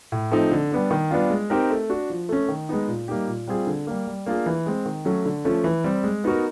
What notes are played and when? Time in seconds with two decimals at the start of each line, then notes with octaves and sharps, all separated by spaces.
0.12 A2
0.31 F3 A3 C4 D#4
0.52 D3
0.72 G3 B3 D4
0.91 D#3
1.11 G3 B3 D4 F4
1.30 G#3
1.50 C4 D#4 G4 A#4
1.70 A3
1.89 D4 F#4
2.10 F3
2.29 A3 C#4
2.48 D#3
2.69 G#3 B3 D#4
2.88 A#2
3.08 G3 A#3 D#4 G4
3.27 A#2
3.47 G3 C4 F4 G#4
3.67 D3
3.87 G3 A#3
4.07 G3
4.26 A#3 D4 F4 G#4
4.46 E3
4.66 G#3 C4
4.85 D#3
5.05 F#3 A3 C#4
5.25 D3
5.45 F3 A3 C#4
5.64 E3
5.84 G3 C4
6.04 G#3
6.24 B3 D#4 F#4 A#4